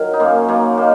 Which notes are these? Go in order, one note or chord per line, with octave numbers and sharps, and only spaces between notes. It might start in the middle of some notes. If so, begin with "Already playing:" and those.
Already playing: D#3 F#3
D#4
F#2 A#3 C#4
F#2 A#3
D#3 A#3